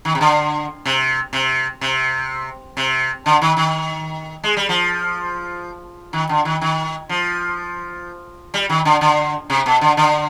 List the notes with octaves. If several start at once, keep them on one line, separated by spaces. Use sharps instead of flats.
D#3
C3
D3
C3
C3
C3
C3
D3
D#3
D#3
G#3
G3
F3
D#3
D3
D#3
D#3
F3
G3
D#3
D3
D3
C3
B2
D3
D3